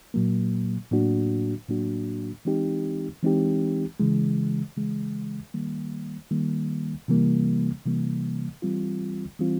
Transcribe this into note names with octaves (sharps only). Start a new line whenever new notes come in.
A#2 F#3 A#3
A2 F#3 A#3 D4 F#4
A2 F#3 A#3 D4 F#4
E3 G#3 C4 D#4 G4
E3 G#3 C4 D#4 G4
C#3 E3 G#3
C#3 E3 G#3
D#3 G3 A#3
D#3 G3 A#3
C3 E3 G3 A#3
C3 E3 G3 A#3
E3 G3 C4 F4
E3 G3 C4 F4